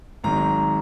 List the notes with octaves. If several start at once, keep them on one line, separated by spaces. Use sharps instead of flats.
G#1 G#2 D#3 F#3 A#5